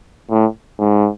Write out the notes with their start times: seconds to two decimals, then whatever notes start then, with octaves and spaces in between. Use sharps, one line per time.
0.31 A2
0.79 G#2